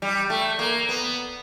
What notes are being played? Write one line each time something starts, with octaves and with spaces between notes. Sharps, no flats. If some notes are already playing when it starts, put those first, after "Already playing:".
G3
A3
A#3
B3